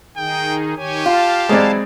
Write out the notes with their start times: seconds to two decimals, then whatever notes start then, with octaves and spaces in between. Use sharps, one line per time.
0.17 D#3 D#4 G#4 G5
0.76 D#3 G4 C#5 G#5
1.06 F4 F5 A5
1.49 E3 F#3 G#3 C4 D5